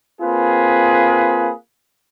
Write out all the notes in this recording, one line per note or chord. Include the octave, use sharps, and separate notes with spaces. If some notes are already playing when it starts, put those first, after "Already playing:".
A#3 C4 F4 G#4 B4